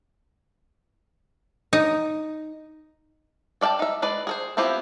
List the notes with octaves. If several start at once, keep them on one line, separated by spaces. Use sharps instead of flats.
D#4
A4 D5 E5 G5 A5
D#4 E5
G#3 B4 D5
G#4 A4 C5
B3 C4 E4 F4 G4